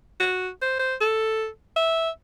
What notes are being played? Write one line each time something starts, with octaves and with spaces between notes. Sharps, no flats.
F#4
C5
C5
A4
E5